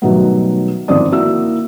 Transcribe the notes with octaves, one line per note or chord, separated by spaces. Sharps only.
B2 D#3 F#3 G3 A3 B3
G1 D#3 F3 C4 D5 D#6
A#3 E4 F#4 E6